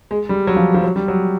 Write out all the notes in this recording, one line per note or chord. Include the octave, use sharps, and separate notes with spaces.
G#3
G3
F#3
F3
F3
F#3
G3
F#3